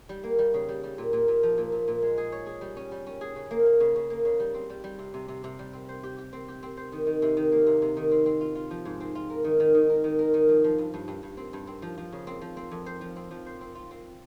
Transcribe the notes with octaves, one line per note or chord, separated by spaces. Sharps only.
G3
A#3
G3
C#3
G3
G3
A#2
A#2
A#2
F3
A#2
A#2
A#2
G#3
G#4
C#5
G#4
G3
C#4
G3
C#4
G#4
C#3
A#3
A#3
C#3
C#3
A#3
C#3
G3
C4
G3
G3
C3
C3
C3
C3
G3
C4
C5
G4
G4
C4
G4
C4
C5
D#3
D#3
C3
D#3
A#3
C3
C3
D#3
C4
C4
F4
F4
F3
G#2
C4
F4
A#4
D#3
D#3
D#3
A#4
D#3
A#4
D#3
F3
F3
G2
G2
G2
G2
C4
G2
C4
F3
F3
C#3
C4
F3
C4
F2
C5
F3
C4
F3
C5
C4
F4
C4